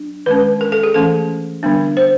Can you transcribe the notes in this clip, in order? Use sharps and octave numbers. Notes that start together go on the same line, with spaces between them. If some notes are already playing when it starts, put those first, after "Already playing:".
Already playing: F#3 D4
D#3 G#3 C#4 B4
A#4
A4
G#4
E3 A3 C#4 A4
D3 G3 B3 D4
C5